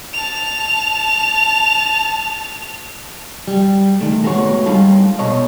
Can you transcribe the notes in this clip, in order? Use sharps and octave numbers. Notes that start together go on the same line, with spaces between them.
A5 F7
G3
D#3 A3
G#3 A3 B3 F#4 C#5
G3 G#3 D#4 F4 G4 A4
B2 A4 C#5 D#5